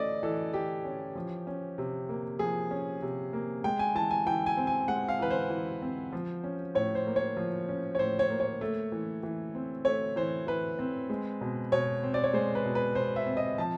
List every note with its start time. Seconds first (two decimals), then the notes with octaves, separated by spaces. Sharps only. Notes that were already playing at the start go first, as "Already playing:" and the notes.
Already playing: E3 A3 C#4 D5 D#5
0.23 E3 A4
0.53 E3 G4
0.84 C#4
1.15 F3
1.47 C#4
1.78 C3
2.09 A#3
2.39 F3 G#4
2.71 C#4
3.02 C3
3.33 A#3
3.64 G#3 G5
3.79 G#5
3.95 E3 A5
4.11 G#5
4.26 E3 G5
4.46 G#5
4.57 C4
4.67 G#5
4.88 G#3 F#5
5.09 F5
5.19 E3 B4
5.30 C5
5.50 E3
5.82 C4
6.13 F3
6.44 C#4
6.75 A2 C#5
6.95 C5
7.06 A#3
7.16 C#5
7.37 F3
7.69 C#4
7.95 C#5
7.99 A2 C5
8.19 C#5
8.30 A#3
8.40 C#5
8.61 A3
8.92 E3
9.23 E3
9.55 C4
9.85 A3 C#5
10.16 E3 C5
10.47 E3 B4
10.79 C4
11.10 G#3
11.41 B2
11.72 B2 C#5
12.03 C4
12.14 D5
12.24 C#5
12.34 G#3 C5
12.55 B4
12.66 B2
12.75 B4
12.95 B2 C5
13.16 E5
13.26 C4
13.37 D#5
13.58 F3 A5